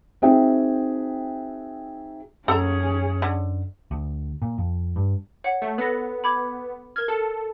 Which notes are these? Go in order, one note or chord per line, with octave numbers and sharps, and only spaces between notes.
C4 D#4 F#4 G#4 E5 G5
F#2 C#4 G#4 A4 A#5
D3
D2
A#2
F2
G2
C#5 F#5
A3
B3 A4 A#6
B5 D6 G#6
A#4 F6 G#6
A4